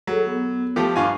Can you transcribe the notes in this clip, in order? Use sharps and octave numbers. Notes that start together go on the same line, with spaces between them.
F#3 G#4 A4
B3
F3 A3 G4
G2 F4 G#5 C#6